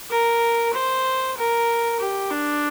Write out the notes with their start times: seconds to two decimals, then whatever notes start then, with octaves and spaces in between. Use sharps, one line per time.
0.10 A#4
0.73 C5
1.37 A#4
1.99 G4
2.31 D4